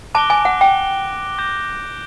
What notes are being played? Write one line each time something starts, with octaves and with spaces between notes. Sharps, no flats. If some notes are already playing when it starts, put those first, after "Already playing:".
A5 D6 F#6 A#6 D7 G7
G#5
F#5
G5
D6 G6 A#6